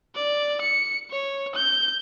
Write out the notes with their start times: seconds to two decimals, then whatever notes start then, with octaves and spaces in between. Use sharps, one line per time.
0.15 D5
0.61 C#7
1.11 C#5
1.56 G6